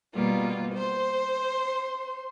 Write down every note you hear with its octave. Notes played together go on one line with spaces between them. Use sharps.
B2 G3 A#3 B3 F4
C5 C6